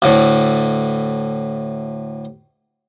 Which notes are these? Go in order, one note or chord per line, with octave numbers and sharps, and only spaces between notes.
D2 A2